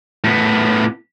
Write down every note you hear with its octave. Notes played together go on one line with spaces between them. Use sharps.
A2 B3